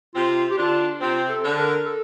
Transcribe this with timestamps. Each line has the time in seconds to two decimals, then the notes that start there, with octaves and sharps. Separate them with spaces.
0.15 C3 C4 F4
0.51 G4
0.58 D3 D4 F4
1.00 C3 C4 F4
1.29 A4
1.43 D3 D4
1.53 A4
1.58 A#4
1.86 A4